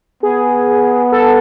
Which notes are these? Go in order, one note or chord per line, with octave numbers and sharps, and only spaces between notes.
B3 G#4
A4